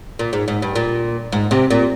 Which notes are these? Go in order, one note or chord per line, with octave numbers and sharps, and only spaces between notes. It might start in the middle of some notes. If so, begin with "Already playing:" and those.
A#2
G#2
G#2
G2
A#2
G#2
C3
A#2